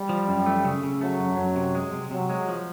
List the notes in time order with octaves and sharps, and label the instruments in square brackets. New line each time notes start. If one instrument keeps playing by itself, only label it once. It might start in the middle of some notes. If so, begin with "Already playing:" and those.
Already playing: [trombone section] G3
[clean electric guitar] F3
F#2
A3
C#3
C#3
[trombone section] F#3 [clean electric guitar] A3
[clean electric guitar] F#2
F#2
C3
G#3
C3
[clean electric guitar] C3 [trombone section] F#3
[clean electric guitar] G#3
F3